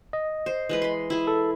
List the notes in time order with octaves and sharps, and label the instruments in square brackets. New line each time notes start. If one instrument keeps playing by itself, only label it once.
[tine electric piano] D#5
[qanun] C5
E3 G#3 B4
B5 C6
E4 G#4
[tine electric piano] A4